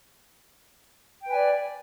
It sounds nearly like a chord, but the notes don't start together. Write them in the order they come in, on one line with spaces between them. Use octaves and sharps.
G5 B4 G#5 D5